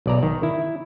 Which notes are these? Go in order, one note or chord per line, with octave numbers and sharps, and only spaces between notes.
B1 D5 A#5
D#3
E4